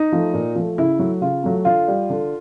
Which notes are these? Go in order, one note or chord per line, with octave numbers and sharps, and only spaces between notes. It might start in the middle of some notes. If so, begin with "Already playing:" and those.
Already playing: D#4
F3 A3
A#2
F3 A3
C#3 E4
F#3 A3
C#3 F4
F#3 A3
D3 F4
G3
D3